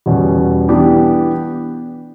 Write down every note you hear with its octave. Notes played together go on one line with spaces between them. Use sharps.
E2 B2 G3 C#4
E3 B3 D4 G4